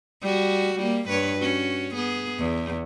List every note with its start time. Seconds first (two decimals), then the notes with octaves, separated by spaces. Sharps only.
0.22 G3 F#4
0.79 G3 A#3
1.09 G2 B4 C#5
1.38 C#4 F#4
1.94 B3 G#4
2.39 E2